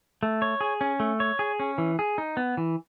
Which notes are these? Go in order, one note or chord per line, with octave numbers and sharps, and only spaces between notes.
A3
C#5
G#4
C#4
A3
C#5
G#4
C#4
E3
G#4
D#4
B3
E3